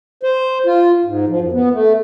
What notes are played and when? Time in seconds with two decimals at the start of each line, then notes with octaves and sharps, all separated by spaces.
0.23 C5
0.66 F4
1.05 G#2
1.28 F3
1.40 F#2
1.52 B3
1.72 A3